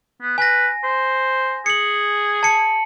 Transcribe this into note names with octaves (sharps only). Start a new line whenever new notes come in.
B3
B4 G#5 A#6
C5
G#4 C#7 F#7
A5 C#7